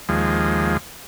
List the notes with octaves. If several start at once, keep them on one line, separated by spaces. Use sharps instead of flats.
D#2 F3 G#3